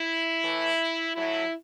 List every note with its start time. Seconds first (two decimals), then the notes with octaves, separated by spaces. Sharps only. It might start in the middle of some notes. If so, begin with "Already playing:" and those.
Already playing: E4
0.44 A2 E3
1.16 A2 F#3 E4